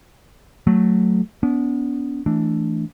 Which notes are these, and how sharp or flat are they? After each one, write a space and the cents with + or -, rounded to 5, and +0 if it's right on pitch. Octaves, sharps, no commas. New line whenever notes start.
F#3 +0 A3 +0
B3 +0 D4 -40
E3 +0 A3 +5 D4 +0